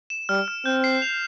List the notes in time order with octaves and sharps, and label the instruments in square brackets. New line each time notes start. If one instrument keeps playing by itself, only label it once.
[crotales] E7
[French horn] G3 [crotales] F6
[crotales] F6
[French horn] C4 [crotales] G6
[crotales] C7
F7